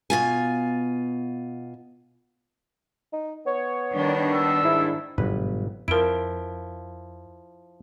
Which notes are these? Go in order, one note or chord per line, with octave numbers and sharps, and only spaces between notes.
B2 F4 G#5
D#4
B3 C#5
D#3 G3 D4
E6
G#2 E4
G1 G#2 B2 F#3 B4
F2 F3 E4 A#4 D7